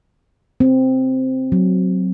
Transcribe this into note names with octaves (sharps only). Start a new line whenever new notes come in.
C4
F#3